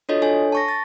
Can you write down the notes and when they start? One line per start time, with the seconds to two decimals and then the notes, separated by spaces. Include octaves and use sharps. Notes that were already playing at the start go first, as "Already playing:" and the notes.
0.09 D4 F4 F#4 A4 C#5 D#5
0.22 D4 A4 C#5 G#5
0.52 A5 C#6 A#6
0.68 A6